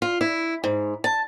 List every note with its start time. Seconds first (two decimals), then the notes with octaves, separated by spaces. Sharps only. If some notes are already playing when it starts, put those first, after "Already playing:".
0.02 F4
0.21 E4
0.64 G#2
1.04 A5